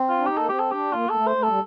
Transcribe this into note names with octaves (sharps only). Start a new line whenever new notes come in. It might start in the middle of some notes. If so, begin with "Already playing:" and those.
Already playing: C4
F4
D4
D#4 G4
A#3 A4
C4 G4
A4
D4 G4
A#3 F4
A#3 A4
A3
C5
A3
G3 A4